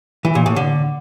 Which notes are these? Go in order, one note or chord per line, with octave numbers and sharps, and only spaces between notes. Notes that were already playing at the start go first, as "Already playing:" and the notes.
E3
A#2
A2
D3